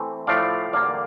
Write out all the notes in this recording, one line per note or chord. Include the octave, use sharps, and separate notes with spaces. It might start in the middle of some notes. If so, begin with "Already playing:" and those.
Already playing: E3 A3 C4
A2 F3 A3 D5 F5
E2 D3 G3 A#3 D5 F5